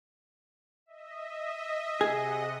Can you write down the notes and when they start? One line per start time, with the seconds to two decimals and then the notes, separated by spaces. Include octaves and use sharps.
0.86 D#5 E5
2.01 C3 G#4 D#5 F#5